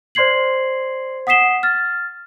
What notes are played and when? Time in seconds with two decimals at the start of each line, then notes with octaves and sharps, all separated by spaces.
0.15 C5 D5 C6 G#6 C7 F#7
1.27 F#5 D#6 B6 C7 E7 G7
1.63 F6 A6